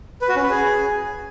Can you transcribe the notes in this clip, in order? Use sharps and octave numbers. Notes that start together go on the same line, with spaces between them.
B4
F#4
C#4
B4
G#4